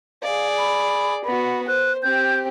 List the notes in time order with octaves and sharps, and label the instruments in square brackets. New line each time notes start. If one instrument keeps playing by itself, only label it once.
[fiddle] G#4 D5 [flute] F5
[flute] B5
[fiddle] B3 F#4 [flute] B5
[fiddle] C5 [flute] F#6
[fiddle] C4 G4 [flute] G6